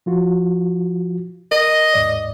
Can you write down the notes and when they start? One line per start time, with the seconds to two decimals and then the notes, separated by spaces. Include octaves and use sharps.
0.06 F3 F4 F#4
1.51 A#4 D#5
1.94 D#2 G#2 D5